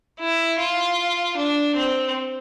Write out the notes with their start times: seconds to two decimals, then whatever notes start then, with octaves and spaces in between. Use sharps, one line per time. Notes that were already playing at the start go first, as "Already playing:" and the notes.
0.19 E4
0.58 F4
1.37 D4
1.75 C4